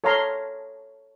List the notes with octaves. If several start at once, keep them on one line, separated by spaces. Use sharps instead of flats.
A4 C#5 F5 G#5 A#5 C6